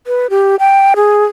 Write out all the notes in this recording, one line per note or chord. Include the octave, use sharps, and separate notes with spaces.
B4
G4
G5
G#4